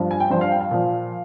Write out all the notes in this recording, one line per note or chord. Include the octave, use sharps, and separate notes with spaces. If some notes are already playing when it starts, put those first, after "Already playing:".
Already playing: G2 F3
G#5
G5
G2 F3 C5
F5
G5
F5
A#2 F3